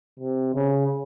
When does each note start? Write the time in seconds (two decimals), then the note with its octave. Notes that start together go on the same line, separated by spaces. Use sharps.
0.20 C3
0.54 C#3